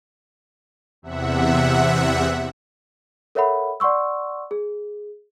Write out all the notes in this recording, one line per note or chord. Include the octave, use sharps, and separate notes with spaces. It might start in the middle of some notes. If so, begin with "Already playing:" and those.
E2 C3 E5 F#5
A4 A#4 C#5 E5 F#5 B5
D5 F#5 C6 C#6 E6
G#4